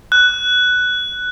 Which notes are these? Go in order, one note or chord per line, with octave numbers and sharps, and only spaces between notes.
F#6